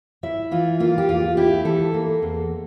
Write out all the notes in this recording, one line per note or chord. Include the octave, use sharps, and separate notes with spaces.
E4 E5
E3 F4
A#3 F4
G4
E2 F4
E4 G4
E3 A4
A#3
E2